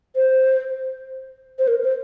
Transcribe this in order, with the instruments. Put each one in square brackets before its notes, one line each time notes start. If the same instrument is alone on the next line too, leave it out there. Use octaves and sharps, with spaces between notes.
[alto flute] C5
C5
A#4
C5